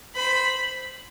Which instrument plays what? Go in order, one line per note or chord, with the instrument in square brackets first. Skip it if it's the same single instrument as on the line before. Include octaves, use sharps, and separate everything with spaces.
[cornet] C5 [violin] B5